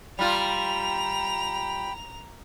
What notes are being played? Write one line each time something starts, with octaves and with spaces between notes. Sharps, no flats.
G3 F4 G5 A#5 B5 F7